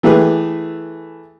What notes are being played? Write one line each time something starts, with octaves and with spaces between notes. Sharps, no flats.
E3 A3 G4 G#4 B4